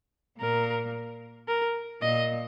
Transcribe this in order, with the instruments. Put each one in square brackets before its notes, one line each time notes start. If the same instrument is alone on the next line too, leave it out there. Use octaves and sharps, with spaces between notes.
[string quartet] A#2 [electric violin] A#4
[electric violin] A#4
[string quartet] A#2 [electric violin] D#5